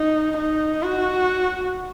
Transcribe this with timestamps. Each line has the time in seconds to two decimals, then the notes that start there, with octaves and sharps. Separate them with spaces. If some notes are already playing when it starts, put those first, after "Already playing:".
Already playing: D#4
0.37 D#4
0.82 F#4